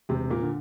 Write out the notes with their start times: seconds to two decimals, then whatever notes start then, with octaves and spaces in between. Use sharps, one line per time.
0.09 E1 C3 C4
0.30 A#2 A#3
0.42 D3